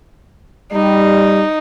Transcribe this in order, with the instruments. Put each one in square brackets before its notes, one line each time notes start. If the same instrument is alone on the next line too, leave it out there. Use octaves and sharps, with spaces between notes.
[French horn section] G3 [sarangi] D#4